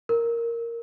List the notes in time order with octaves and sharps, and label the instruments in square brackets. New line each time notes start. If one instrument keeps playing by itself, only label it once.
[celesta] A#4